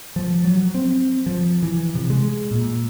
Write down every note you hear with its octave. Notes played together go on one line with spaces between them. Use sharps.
F3
F#3
C4
F3
E3
C3
G#3
A#2